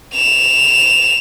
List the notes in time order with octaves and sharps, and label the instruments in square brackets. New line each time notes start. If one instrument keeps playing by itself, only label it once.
[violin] E7 F7